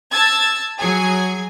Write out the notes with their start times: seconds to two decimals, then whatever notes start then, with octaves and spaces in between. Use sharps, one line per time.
0.13 A5 E6 G#6 A6
0.79 F#3 G#4 G#5